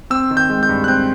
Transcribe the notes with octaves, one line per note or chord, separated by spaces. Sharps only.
C4 E6
D#3
G6
G#3
G6
G2
F#6
C4 G6